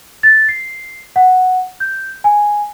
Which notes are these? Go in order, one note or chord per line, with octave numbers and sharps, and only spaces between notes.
A6
C7
F#5
G6
G#5